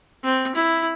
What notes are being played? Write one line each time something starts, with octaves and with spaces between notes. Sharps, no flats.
C4
E4